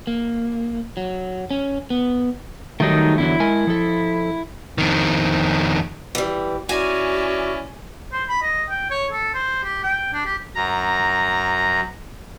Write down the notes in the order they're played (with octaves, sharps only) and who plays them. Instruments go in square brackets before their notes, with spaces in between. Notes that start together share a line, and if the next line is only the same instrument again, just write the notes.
[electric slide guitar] A#3
F#3
C#4
B3
[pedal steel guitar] D#3 D#4 [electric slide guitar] F#3 G3 A3
[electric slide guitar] E2 D3 F#3 [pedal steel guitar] E4
[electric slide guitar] G#3 A#4 G#5
F3 A4
[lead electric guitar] F2 D#3
[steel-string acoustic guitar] E3 G3
[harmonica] C#4 E4 D5 [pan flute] F#4 [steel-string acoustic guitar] G#5
[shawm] C5
B5
D#5
G5
C#5
A4
C5
G4
G5
D4
G4
[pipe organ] F#2 A#5